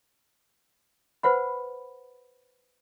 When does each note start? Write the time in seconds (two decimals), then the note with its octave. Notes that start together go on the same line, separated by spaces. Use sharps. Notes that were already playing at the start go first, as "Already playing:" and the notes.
1.23 B4 C5 F#5 B5